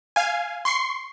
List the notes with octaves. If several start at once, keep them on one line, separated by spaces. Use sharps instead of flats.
F5 G#5
C6 C#6 C7